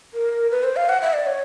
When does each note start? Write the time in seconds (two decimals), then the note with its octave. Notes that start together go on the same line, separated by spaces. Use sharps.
0.14 A#4
0.51 B4
0.64 C5
0.76 F5
0.89 F#5
1.02 E5
1.13 D5
1.26 C#5